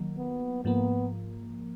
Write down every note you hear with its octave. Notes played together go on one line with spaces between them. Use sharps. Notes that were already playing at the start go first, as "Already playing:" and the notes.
Already playing: D#3 F#3 A#3
B3
G#2 F3 A#3 B3